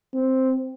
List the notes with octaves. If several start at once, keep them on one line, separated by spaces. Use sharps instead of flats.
C4